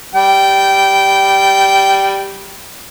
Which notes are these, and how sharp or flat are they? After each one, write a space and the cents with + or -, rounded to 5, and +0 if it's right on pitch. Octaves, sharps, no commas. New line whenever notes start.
G3 +0 G5 -15